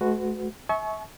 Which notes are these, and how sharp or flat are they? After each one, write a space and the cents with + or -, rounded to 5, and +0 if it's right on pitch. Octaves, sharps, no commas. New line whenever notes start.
A3 -45 F#4 +0 B4 +35
E5 -30 G#5 +45 C#6 +0